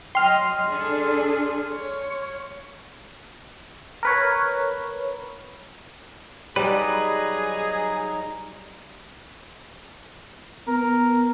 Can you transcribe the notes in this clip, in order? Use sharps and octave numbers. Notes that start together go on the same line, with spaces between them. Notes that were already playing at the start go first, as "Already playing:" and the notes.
F#3 D#5 G5 C6 F6
D4 G#4 A4
C#5
A#4 B4 C#5
F#3 G3 D#4 G#4 B4 A#5
B3 A#4